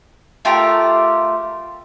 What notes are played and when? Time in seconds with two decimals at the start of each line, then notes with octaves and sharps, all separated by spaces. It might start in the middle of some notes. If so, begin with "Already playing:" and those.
0.45 A3 F4 G4 A#4